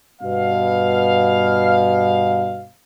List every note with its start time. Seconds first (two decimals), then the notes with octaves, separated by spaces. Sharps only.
0.22 G2 B2 B3 F5